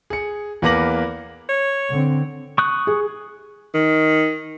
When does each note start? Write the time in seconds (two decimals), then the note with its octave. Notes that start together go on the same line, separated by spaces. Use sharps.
0.10 G#4 C#7
0.62 E2 A#3 B4 D6 A#6 F#7
1.49 C#5
1.91 D3 C4
2.58 C#6 D#6 F#6
2.87 G#4
3.74 D#3